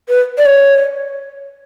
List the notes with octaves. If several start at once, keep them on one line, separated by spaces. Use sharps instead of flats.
B4
D5
C#5